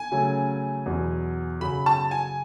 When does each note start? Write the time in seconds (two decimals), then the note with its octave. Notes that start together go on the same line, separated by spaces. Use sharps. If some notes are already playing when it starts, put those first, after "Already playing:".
Already playing: G#5
0.12 C#3 F#3 A3 C#4
0.86 E2 B2 F#3
1.60 F#2 C#3 F#3 B5
1.86 A5
2.11 G#5